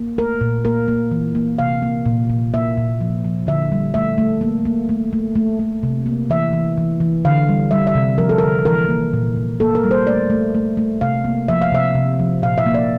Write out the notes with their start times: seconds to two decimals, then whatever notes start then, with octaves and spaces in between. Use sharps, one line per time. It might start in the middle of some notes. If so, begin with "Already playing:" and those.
Already playing: A#3
0.18 A3 A#4
0.41 A#2
0.65 A#3 A#4
0.88 A#3
1.11 E3
1.35 A#3
1.58 C3 F5
1.83 A#3
2.06 A#2
2.30 A#2
2.54 A#3 E5
2.77 A#2
3.01 F3
3.25 F3
3.47 D3 E5
3.72 G3
3.94 A3 E5
4.18 A3
4.41 A#3
4.65 A#3
4.89 A3
5.13 A3
5.35 A3
5.59 A3
5.83 C3
6.06 A#3
6.30 E3 E5
6.53 E3
6.78 E3
7.00 E3
7.25 D3 F5
7.48 G3
7.71 G3 E5
7.87 E5
7.95 C3
8.18 F3 A#4
8.29 A4
8.38 A#4
8.43 D3
8.65 E3 A#4
8.89 A#3
9.13 A#2
9.36 A#2
9.60 A#3 A4
9.75 A#4
9.84 G3
9.91 C5
10.07 A3 D5
10.30 A3
10.55 A3
10.77 A3
11.01 C3 F5
11.24 A#3
11.48 F3 E5
11.62 F5
11.72 C3 E5
11.95 C3
12.19 F3
12.42 A#2 F5
12.58 E5
12.66 A#3
12.74 D5